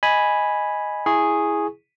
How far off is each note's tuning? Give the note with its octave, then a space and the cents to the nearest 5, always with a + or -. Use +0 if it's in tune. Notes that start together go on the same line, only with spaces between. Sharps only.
D#5 +0 G#5 +0 B5 -5
E4 +0 G#4 +0 C#6 -15